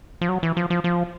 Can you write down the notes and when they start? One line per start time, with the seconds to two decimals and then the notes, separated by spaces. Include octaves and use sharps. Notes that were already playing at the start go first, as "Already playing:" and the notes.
0.21 F3
0.29 F#3
0.43 E3
0.57 F3
0.70 F3
0.84 F3